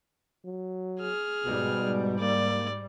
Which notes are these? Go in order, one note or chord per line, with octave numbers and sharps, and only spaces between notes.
F#3
G#4 F6
G#2 B2 G3
A#3 D5